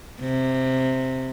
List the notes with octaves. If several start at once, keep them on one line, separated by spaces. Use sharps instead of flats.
C3